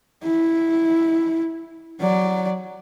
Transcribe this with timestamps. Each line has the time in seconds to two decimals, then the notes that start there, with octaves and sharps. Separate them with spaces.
0.23 E4
2.00 F#3 D5